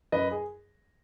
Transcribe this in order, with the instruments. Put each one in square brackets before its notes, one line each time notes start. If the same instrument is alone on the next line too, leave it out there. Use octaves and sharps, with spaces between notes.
[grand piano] F#2 B4 D#5
G#4